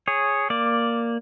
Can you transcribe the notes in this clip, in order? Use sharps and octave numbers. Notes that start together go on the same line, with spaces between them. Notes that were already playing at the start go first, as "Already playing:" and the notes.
G#4 C#5
A#3 D5